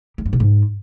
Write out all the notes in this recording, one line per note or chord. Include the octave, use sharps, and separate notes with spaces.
G3
G2
B2
G#2